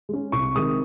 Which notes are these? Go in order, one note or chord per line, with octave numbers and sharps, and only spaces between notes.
G#3 C#4
C2 C#6
C3 D#3 G#3 C4 D#6